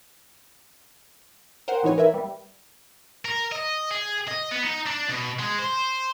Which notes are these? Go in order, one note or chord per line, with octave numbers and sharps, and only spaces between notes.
A#4 C5 F#5 G5
A2 E3 D#4 C#5 G#5
A#4 B4 E5
G3
A#4
D#5
G#4
D#5
B3
D#4
D4
B2
G#3
C5